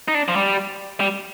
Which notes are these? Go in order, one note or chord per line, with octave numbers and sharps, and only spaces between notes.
D#4
D4
F3
G3
G3